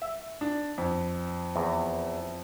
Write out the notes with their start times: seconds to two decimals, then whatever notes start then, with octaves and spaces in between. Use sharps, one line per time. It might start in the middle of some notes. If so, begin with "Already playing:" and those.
0.02 E5
0.41 D4
0.78 F2
1.56 E2